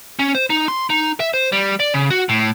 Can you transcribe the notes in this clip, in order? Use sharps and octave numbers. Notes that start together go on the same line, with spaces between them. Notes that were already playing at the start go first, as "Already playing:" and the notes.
C#4
C5
D#4
C6
D#4
E5
C5
G3
D5
C#3
F#4
A2